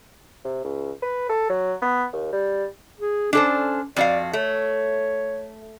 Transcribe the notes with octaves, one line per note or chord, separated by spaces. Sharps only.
C3
C#2
B4
A4
F#3
B3
D#2
G3
G#4
C#4 D4 A4 C5
F2 F#4 D5 F5
A3 C#5